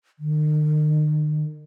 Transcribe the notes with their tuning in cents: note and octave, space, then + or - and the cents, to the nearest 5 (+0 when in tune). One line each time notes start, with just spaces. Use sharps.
D#3 -40